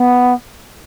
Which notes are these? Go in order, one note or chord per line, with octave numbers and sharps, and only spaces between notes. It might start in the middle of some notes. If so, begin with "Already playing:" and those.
Already playing: B3